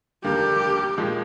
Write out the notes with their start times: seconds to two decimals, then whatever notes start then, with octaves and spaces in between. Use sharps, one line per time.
0.24 F1 D#2 D3 G3 A#3 G4
0.98 A#2 F3 G#3